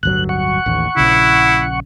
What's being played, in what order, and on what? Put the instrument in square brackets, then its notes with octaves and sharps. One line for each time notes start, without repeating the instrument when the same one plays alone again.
[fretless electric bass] D1 G1 F#3 [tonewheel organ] F#6
[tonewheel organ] F#5 C#6
[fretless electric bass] A1 D#2
[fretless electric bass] A#1 C#3 [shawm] E4